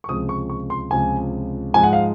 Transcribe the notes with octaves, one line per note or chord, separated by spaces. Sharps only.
C#6
C#2 C3 F3 G#3 D#6
C#6
C#6
C6
C#2 C3 F3 G#3 G#5
G#2 F3 G#3 G#5
F#5
F5